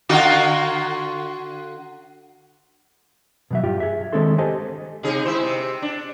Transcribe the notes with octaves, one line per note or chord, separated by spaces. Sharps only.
D3 F4 F#4
B2 F#3 E5
G2 F4 G4
G#4 E5
D#3 G#3 C4 D4 A4 C6
G4 A4 C5 D#5 G#5 A5
C3 D#4 G#4
G#3 E4 C5
C3
D4